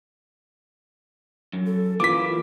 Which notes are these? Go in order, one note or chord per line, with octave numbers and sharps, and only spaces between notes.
F#2
A4
E3 A#3 B3 F4 D6 B6